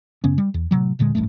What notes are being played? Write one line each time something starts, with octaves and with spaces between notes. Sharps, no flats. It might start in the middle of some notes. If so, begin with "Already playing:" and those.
F#2 C#3 B3 C#4
G3
E2
A2 C3 F#3 G3
D#1 A#2 D3 G#3
D1 A1 G2 A3